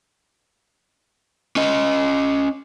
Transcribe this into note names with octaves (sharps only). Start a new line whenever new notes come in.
C#4 D#5